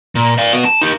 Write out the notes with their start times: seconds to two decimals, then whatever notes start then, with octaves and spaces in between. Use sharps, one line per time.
0.15 A#2
0.38 D5 F5
0.53 B3 F#4
0.65 A5
0.81 D#4 G4